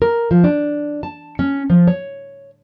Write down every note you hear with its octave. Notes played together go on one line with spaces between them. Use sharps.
A#4
F3
D4
A5
C#4
F3
C#5